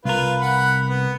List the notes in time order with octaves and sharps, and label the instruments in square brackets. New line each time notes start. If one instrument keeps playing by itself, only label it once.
[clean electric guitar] C2 A#4 [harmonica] F4 B4
[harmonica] F#5 B5
B3